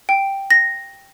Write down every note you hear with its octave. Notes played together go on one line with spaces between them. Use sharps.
G5
A#6